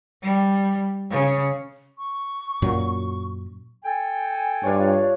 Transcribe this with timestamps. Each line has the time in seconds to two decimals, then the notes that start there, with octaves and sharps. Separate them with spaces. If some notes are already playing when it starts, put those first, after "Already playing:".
0.22 G3
1.10 C#3
1.98 C#6
2.62 F#2 A#2 F#3
3.84 A4 G5 G#5
4.63 G2 D4 F4 C#5